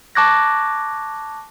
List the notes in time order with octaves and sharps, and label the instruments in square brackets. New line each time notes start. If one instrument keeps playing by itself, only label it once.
[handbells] A5 C#6 D6 F#6 G#6 A#6